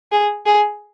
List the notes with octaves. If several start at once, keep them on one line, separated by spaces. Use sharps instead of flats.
G#4
G#4